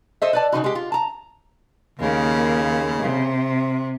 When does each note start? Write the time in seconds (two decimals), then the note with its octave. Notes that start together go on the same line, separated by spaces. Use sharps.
0.22 A4 C5 D#5 E5
0.33 B4 D5 A5
0.52 C#3 E3 D#4 F#4
0.64 G#3 G4
0.75 F4
0.92 A5 A#5
1.99 D#2 C#3 A#3
3.02 C3